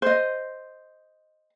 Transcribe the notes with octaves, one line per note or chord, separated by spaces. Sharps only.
C5 D#5